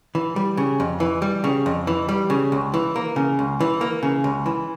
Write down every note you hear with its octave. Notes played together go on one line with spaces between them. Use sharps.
E3
G3
C#3
F2
E3
G3
C#3
F2
E3
G3
C#3
C#2
E3
A#3
C#3
C#2
E3
A#3
C#3
C#2
E3